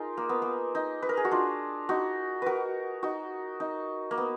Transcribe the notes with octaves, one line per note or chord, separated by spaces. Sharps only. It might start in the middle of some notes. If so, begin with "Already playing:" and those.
Already playing: D#4 F4 G#4 A#4
A#3
B3
A#3
D#4
B4
A#4
G#4
F#4
D4 F4
D#4 F#4
F#4 A#4 B4
D#4 F#4
D#4
A#3
B3